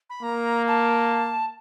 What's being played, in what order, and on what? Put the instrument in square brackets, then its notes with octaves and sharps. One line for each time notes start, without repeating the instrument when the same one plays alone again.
[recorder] B5
[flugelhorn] A#3 [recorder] A#5
[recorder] A5